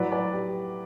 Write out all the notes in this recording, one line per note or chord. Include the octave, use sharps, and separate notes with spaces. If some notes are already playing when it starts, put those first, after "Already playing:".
Already playing: A2 F#3 B4 D5
B4 D5
G4